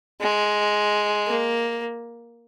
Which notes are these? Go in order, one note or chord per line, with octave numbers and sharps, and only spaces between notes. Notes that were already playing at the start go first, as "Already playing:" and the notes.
G#3
A#3